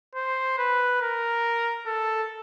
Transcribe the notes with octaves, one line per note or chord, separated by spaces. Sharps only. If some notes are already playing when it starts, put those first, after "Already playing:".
C5
B4
A#4
A4